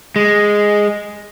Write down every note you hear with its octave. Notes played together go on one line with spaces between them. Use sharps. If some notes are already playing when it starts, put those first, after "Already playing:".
G#3